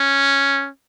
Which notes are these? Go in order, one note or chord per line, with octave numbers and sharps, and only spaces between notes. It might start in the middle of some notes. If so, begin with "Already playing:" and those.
Already playing: C#4